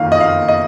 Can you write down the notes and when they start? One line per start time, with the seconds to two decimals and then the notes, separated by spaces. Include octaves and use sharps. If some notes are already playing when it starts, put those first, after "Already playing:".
Already playing: F#1 F2 D#3 A#3 D#4 F5
0.12 D#5
0.21 F5
0.48 D#5